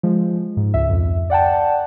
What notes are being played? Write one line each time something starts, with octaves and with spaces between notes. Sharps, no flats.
F3 G#3
G#2
C#2 E5
F2
D5 F#5 G5 A5